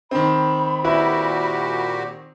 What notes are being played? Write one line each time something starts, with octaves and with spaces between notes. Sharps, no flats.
D#3 C4 B5
A#2 E4 F#4 G4 B4 E5